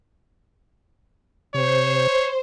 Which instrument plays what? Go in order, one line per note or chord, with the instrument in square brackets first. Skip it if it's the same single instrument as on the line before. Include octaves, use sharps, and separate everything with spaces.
[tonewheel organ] C3 [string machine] C5 [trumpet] C#5